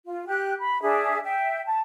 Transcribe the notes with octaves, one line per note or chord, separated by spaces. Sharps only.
F4
G4 G5 F#6
B5
D4 G#4 E5
E5 G5
A5